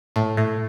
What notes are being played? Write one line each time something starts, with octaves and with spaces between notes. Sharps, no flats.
A2
A2